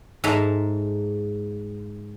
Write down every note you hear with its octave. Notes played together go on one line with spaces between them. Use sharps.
G#2 G#3 A4 E5 A5 A#5